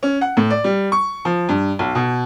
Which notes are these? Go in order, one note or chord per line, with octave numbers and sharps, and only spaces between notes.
C#4
F#5
A2
D5
G3
C#6
F3
G2
B1
B2